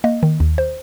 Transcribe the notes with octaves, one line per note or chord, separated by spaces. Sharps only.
A#3 D#5
D#3
D#2
C5